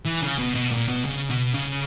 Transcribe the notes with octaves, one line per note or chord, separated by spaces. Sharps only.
E3
C#3
B2
B2
A#2
B2
C#3
B2
C#3